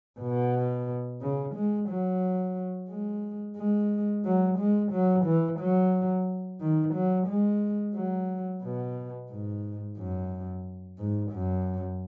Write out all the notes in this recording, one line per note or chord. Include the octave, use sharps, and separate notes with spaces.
B2
C#3
G#3
F#3
G#3
G#3
F#3
G#3
F#3
E3
F#3
D#3
F#3
G#3
F#3
B2
G#2
F#2
G#2
F#2